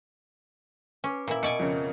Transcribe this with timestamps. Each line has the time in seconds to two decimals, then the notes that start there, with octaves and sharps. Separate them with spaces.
1.04 C#4 B4 D6
1.28 A#2 E4 A#4
1.43 B2 D5 G#5 C#7
1.59 F2 C#3 F4 A#4